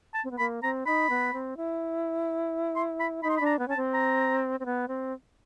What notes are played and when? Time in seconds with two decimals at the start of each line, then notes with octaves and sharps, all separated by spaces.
0.14 A5
0.24 C4
0.31 B3
0.39 A#3 B5
0.63 C4 A#5
0.86 D#4 B5
1.10 B3
1.33 C4
1.57 E4
2.76 C6
3.00 B5
3.23 D#4 B5
3.29 C6
3.37 B5
3.40 D4
3.46 A#5
3.59 B3
3.68 C#4 A5
3.77 C4
3.94 A#5
4.60 C4
4.65 B3
4.88 C4